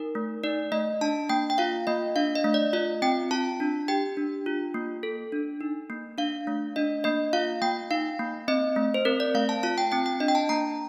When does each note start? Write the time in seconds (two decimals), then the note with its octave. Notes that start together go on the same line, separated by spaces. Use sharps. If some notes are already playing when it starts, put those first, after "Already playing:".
Already playing: D#4 A#4
0.15 A3
0.43 D#4 D5
0.72 A3 D#5
1.01 D4 A5
1.29 A#3 G5
1.50 G5
1.58 F4 F5
1.87 A#3 D#5
2.16 D4 F5
2.35 D#5
2.44 A3
2.54 D5
2.73 F4 D#5
3.02 C4 G5
3.31 F4 A5
3.60 D4
3.88 G4 G5
4.17 D4
4.46 F4
4.74 A#3
5.03 A4
5.32 D4
5.61 D#4
5.90 A#3
6.18 D4 F5
6.47 A3
6.76 D4 D#5
7.04 A#3 D#5
7.33 F4 F5
7.62 A#3 G5
7.91 D#4 F5
8.19 A#3
8.48 C4 D#5
8.76 A3
8.94 C5
9.05 C4 A#4
9.20 D5
9.34 A3 F5
9.49 A5
9.63 F4 A5
9.78 G5
9.92 C4 G5
10.06 G5
10.20 D4 D#5
10.28 G5
10.35 A5
10.49 A#3 A#5